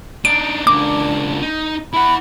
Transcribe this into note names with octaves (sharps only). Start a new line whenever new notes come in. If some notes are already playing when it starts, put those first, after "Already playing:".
D4 D#4 D7
C#2 A#3 D4 D6
D#4
E4 F#5 B5